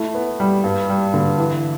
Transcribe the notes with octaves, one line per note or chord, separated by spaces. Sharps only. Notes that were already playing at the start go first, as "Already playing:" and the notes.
Already playing: A3 E4
B3
G3
G2
G3
D3
E3